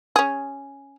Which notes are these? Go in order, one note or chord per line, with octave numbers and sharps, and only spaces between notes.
C#4 G#4